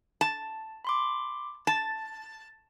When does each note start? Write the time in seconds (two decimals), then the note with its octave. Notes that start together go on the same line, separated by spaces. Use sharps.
0.21 A5
0.85 B5 C6 D6
1.67 A5 A6